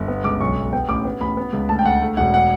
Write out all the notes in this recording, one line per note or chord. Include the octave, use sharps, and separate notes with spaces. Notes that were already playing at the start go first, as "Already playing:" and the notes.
Already playing: G1
B3
C#2 D6
B1 C#6
B1
B3 G5
A1 D6
B3
A1 B5
B3
C#2
D2 A5
G5
D2 F#5
A3
E1 F#5
F#5